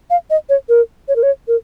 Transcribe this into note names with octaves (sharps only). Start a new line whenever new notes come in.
F5
D#5
C#5
A#4
C#5
A#4
C#5
A#4